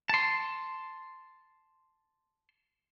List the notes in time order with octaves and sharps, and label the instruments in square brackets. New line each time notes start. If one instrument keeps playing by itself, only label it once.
[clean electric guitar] A5 C6